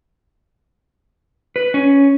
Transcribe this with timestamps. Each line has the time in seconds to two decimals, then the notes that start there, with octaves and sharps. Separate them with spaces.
1.56 B4
1.74 C#4